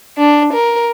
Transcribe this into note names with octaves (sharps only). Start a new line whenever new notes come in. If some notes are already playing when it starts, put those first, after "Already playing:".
D4
A#4